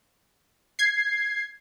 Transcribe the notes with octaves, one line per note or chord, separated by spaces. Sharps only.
G#6 C7